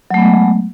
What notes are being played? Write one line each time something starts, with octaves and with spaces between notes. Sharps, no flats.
F#3 G#3 A3 B3